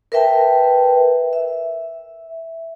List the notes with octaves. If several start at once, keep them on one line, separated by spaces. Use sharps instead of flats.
A#4 B4 E5 G5 A5
E5